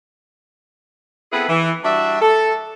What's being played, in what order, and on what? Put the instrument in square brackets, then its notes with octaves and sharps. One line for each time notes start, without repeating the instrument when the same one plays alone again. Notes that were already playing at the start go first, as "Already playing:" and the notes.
[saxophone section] B3 C4 E4 G#4 A4 B4
E3
G3 D4 F#4 E5
A4